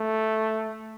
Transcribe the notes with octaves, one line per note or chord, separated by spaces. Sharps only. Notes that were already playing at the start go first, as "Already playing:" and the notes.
Already playing: A3